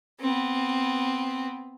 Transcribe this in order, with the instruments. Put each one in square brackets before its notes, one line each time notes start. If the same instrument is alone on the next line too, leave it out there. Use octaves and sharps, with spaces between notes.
[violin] B3 C4